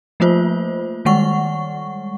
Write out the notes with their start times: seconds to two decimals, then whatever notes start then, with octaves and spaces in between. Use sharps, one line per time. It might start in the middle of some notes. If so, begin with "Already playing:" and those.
0.20 F3 A3 A#3 F4 C5
1.05 D#3 G3 G#3 F#5 C#6